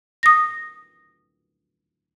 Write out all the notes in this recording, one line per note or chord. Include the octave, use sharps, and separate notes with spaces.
D#6 A#6